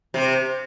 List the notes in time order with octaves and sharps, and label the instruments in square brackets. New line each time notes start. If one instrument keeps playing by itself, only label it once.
[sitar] C3